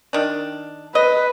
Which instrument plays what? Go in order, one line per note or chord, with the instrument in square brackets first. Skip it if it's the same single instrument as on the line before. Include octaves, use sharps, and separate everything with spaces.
[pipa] D#3 D4
[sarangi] B4 [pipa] D#5